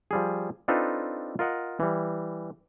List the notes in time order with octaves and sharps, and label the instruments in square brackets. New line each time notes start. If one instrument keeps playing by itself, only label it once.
[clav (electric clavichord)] F3 G3 G#4
C4 D4 D#4 F4 A4 B4
F4 A#4 D#5 F#5
E3 G3